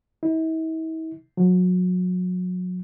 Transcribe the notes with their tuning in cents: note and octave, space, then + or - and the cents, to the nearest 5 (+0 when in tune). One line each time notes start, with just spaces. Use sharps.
E4 -45
F#3 -30